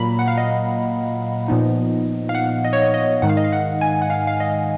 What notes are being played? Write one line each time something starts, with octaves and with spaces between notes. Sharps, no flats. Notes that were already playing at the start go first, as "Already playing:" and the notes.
Already playing: A#2 F#3 A#3 A#5 B5
F#5
F5
D#5
A#2 F3 B3 D#4
F5
F#5
D#5
C#5
D#5
D#5
G#2 D#3 G#3 D#4 F#5
F5
D#5
F5
F#5
G#5
F#5
F5
F5
D#5